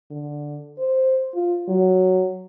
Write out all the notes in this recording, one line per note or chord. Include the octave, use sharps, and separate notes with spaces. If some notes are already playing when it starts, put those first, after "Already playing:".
D3
C5
F4
F#3